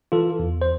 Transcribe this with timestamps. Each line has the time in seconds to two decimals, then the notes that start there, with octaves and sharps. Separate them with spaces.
0.12 E3 F4 A4
0.39 E2
0.62 C5